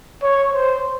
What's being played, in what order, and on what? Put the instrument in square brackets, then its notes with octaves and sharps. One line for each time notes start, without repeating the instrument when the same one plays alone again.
[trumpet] C#5
C5